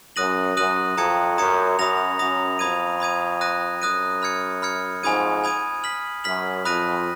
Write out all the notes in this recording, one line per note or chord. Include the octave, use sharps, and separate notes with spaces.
F#2 D#6 F#6 A#6 D#7 F#7
F#2 D#6 F#6 A#6 D#7 F#7
F2 A#5 D#6 G#6 C#7
F#2 A#5 D#6 G#6 C#7
F#2 B5 D#6 A#6 F7
F#2 B5 D#6 A#6 F7
F2 B5 D#6 G#6 D#7
B5 D#6 G#6 D#7
D#6 F#6 A#6 D#7
F#2 D#6 F#6 A#6 D#7
B5 F6 G#6 C#7
B5 F6 G#6 C#7
F2 G#2 G#5 B5 D#6 G#6 D#7
G#5 B5 D#6 G#6 D#7
F6 B6 F#7
F#2 F6 B6 F#7
F2 B5 D#6 F#6 A#6 D#7